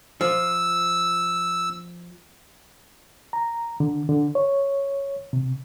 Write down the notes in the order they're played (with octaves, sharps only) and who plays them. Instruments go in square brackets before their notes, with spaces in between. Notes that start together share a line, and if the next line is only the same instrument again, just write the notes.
[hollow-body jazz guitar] F3 [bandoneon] E6
[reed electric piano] A#5
D3
D3
C#5
C3